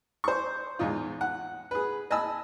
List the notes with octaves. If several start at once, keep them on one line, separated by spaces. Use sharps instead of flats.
C5 C#6
E2 G#2 D#4 F4
F#5
G#4 B4
D#5 G#5 A5 B5 E6